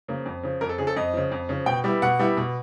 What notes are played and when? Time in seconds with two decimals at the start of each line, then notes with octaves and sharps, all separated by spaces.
0.08 C#3 F3 A#3
0.26 F2
0.43 C#3 F3
0.61 F2 A#4
0.69 A4
0.78 C#3 F3 G#4
0.87 A4
0.96 F2 D#5
1.14 C#3 F3
1.31 F2
1.49 C#3 F3
1.66 B2 G5
1.84 G3 B3 E4
2.02 B2 F#5
2.19 G3 B3 E4
2.37 B2